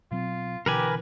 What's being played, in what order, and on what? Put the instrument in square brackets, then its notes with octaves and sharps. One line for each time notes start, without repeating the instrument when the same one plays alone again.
[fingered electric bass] B2 F#3 C4 [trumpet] F4
[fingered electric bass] B2 D3 E3 [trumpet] G4 [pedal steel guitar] A#4 B4 G#5